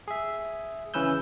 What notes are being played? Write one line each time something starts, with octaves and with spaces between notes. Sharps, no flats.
G#4 E5
C#3 E3 C#4 B4 E6 G6